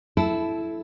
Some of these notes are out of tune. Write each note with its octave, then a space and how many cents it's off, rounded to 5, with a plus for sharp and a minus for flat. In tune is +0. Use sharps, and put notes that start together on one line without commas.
E4 +5 A4 -15